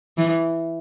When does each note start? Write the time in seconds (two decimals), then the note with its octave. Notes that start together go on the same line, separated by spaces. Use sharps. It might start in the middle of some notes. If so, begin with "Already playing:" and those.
0.18 E3